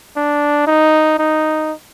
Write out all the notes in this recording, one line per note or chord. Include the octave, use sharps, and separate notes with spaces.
D4
D#4
D#4